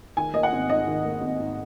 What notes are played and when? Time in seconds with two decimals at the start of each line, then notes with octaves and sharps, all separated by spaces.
0.17 D#3 G#5
0.34 A#3 D#5
0.43 F#5
0.53 G#1
0.69 G#2 D#5
0.87 D#3
1.05 A#3
1.21 G#1
1.39 G#2